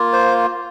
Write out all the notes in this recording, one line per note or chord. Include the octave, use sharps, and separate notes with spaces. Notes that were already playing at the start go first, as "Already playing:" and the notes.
Already playing: A#3 F4
C5